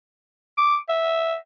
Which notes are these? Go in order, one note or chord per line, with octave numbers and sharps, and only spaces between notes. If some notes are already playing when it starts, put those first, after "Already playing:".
D6
E5